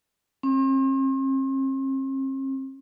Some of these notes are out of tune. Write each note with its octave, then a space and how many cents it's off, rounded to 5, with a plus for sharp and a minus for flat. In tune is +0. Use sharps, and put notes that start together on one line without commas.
C4 +45